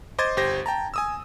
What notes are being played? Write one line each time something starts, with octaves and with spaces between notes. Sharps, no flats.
C5 D#5 C6 D6 G#6 A6
G1 G4 C5 A#6
G5 A5 A#5
G#5 D#6 E6